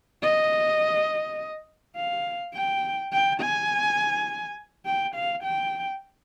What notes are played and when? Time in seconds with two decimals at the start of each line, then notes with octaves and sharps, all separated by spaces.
0.22 D#5
1.96 F5
2.54 G5
3.12 G5
3.41 G#5
4.86 G5
5.15 F5
5.44 G5